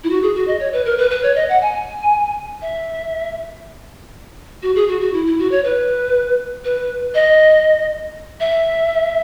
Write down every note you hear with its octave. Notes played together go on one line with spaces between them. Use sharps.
E4
F#4
G#4
F#4
D#5
C#5
B4
A#4
B4
B4
C#5
D#5
F#5
G#5
E5
F#4
G#4
F#4
F#4
E4
E4
F#4
C#5
B4
B4
D#5
E5